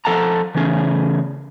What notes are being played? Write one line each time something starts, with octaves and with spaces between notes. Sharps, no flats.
F3 A4 F#5 A5 A#5
C#3 E3 A3 C#4 G#4